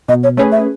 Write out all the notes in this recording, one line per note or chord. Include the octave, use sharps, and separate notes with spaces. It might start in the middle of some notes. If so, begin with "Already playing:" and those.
B2 D#5
C#5
A3 C#4 G#4 B4 C#5
E5